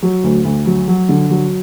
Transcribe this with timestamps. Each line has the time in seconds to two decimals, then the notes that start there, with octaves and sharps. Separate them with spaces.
0.02 F#3
0.24 D2
0.45 D2
0.66 F#3
0.88 F#3
1.09 D3
1.30 F#3